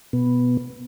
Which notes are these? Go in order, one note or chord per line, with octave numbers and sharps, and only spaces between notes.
B2 B3